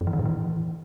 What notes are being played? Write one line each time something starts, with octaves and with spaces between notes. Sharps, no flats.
F#2
E3
D#3
A2
E3